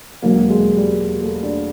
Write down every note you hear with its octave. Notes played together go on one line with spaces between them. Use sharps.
E1 D#2 D3 F#3 A#3
G#3
G3
A3
D4